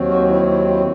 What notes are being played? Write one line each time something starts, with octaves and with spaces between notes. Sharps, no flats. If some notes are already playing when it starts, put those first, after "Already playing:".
Already playing: D#2 D#3 F#3 C4
F#4
E4
E4
E4